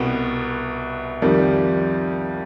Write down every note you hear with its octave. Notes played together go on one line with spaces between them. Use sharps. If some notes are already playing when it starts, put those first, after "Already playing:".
Already playing: C2 B2 B3
F2 D#3 G3